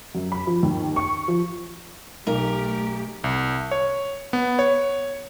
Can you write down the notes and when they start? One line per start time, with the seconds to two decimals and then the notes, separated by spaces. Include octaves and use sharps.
0.15 F#2
0.32 B5
0.47 F3
0.63 D#2
0.96 C#6
1.28 F3
2.27 B1 A3 G4 A#4
3.24 C2
3.71 C#5
4.33 B3
4.59 C#5